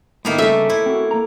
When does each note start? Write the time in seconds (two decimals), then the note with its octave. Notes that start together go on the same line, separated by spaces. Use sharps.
0.25 A2 D#3 A#3 B3 E5
0.38 G2 C#3 A3 A#3 E5
0.70 E4 C5
0.86 C4 F#4
1.11 A#3 A#5